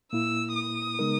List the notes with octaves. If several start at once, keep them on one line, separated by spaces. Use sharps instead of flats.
A#2 A#3 E4 E6
D#6
C#3 G#3 B3 D#4 A#4